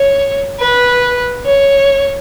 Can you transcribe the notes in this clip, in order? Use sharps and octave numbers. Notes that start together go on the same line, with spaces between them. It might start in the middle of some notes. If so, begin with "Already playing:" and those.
Already playing: C#5
B4
C#5